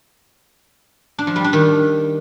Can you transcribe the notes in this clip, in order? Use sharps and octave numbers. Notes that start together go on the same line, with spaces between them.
D4
F3
G3
D4
D#3